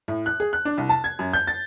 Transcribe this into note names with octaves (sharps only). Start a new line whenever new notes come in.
A2
F#6
G#4
F#6
D4
C2
A5
G#6
F#2
G6
A6